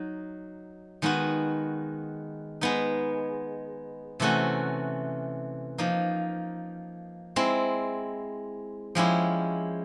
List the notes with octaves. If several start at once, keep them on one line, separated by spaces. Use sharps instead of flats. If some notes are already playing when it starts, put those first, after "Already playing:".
Already playing: F#3 D#4
D#3 G#3 B3 D#4 F#4
G#3 B3 D#4
C3 E3 A3 C#4 F#4
F3 A#3 D#4
G#3 C4 E4
F3 G#3 C#4 E4 G4